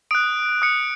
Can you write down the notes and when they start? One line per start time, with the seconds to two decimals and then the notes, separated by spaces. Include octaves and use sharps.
0.11 D#6 F#6 D7
0.62 D#6 F#6 C#7